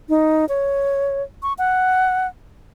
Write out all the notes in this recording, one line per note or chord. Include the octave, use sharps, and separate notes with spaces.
D#4
C#5
C#6
F#5